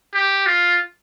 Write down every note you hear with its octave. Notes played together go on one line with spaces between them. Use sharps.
G4
F4